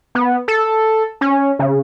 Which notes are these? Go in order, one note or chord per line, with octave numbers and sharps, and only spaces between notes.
B3
A4
C#4
C#3